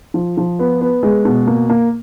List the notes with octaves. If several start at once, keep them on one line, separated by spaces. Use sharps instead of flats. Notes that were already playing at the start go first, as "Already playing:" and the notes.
F3
F3
B3
B3
G#3
B2
A#3
A#3